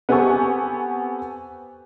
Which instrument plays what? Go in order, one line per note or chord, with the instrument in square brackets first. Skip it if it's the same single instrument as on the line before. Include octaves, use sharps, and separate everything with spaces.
[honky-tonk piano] B3 C4 G4 A4 G#5 C#6